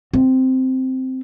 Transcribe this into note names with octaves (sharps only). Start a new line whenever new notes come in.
C4